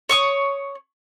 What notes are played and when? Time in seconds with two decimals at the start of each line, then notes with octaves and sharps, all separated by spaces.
0.09 C#5 C#6 D#6